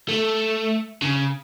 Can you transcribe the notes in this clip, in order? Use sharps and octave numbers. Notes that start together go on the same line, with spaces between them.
A3
C#3